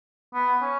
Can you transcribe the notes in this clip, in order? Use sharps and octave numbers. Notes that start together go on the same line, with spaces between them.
B3
C#4